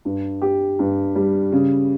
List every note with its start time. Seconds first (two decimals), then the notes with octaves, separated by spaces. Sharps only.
0.05 G2
0.42 G4
0.79 G2
1.16 G3
1.52 C#3